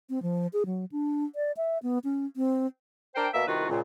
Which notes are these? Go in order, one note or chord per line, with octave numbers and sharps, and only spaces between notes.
C4
F3
G#4
F#3
D4
D5
E5
B3
C#4
C4
D4 A#4 C5 G5
B2 A#3 E5
C2 D#3 F4 F#4 B4
C#2 A#2